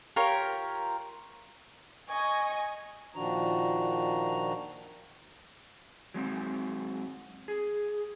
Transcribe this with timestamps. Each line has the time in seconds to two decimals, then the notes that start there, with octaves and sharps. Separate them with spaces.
0.16 F4 G4 A#4 C#5
2.09 D#5 G#5 C#6
3.15 A#2 D#3 F3 D4 F#4 A#5
6.14 F#3 G#3 C4
7.48 G#4